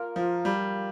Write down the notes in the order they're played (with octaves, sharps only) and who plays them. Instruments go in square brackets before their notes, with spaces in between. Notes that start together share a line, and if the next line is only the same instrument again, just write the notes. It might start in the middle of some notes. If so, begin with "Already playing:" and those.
Already playing: [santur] A#3 F4 A#4
[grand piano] F3
G3